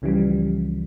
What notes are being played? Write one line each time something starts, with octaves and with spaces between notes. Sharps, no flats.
C#2 C#3 E3 F3 G3